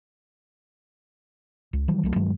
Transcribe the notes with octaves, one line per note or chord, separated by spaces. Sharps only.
C#2
D#3 E3 F#3 G3
C2 F#3 A3
G2 D#3 F#3 G#3